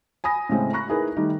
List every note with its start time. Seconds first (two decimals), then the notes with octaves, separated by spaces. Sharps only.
0.24 G#5 B5 D#6 A#6
0.49 A2 C#3 G#3 C4
0.73 A#5 B5 C#6 F#6 A#6
0.88 D#4 E4 G#4 A#4 B4
1.16 D#3 G3 A3 D#4